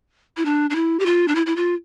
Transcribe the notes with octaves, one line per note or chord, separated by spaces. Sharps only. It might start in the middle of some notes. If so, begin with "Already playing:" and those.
E4
D4
D4
E4
G4
F4
D4
E4
E4
F4